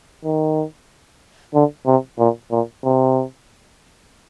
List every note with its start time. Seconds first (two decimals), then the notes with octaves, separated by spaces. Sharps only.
0.25 D#3
1.54 D3
1.87 C3
2.19 A#2
2.51 A#2
2.84 C3